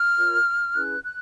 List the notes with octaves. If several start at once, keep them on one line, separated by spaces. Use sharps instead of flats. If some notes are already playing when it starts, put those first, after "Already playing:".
Already playing: F6
F4 A#4 C#5
C#4 E4 G#4 B4 F#6
F#6